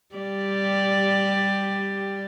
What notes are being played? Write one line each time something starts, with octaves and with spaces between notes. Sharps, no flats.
G3 G4 D5